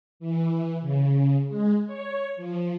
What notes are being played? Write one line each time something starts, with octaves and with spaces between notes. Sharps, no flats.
E3
C#3
G#3
C#5
F3